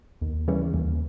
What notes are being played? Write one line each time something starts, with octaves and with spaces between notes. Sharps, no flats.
D#2
C#3 E3 G3 C#4
D#2